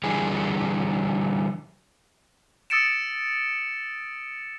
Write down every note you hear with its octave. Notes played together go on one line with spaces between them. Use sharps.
D3 E3 G3 G#4
D#6 E6 A6 C#7 D7 E7